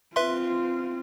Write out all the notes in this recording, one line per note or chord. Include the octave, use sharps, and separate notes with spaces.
C4 F4 B4 E5 C6